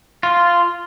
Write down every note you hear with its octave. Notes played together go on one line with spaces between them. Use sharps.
F4